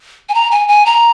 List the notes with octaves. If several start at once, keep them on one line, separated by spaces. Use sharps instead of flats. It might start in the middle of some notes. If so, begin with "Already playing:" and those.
G#5
A#5
G#5
G#5
A#5